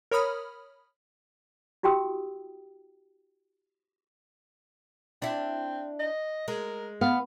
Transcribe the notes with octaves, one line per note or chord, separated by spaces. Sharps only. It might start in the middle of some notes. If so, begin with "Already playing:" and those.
A#4 C#5 B5 D#6 F6
E4 F#4 G4 G5 D#6 E6
C4 D4 E4
D#5
G#3 A#4
B3 F5